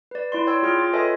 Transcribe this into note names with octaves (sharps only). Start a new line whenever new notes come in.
B4 D5
E4 D5 C6
C#5 G5 C6 E6
F4 G#4 G5 C6 F6
F4 A6
A4 B4 C#5 D#5 E5 G#5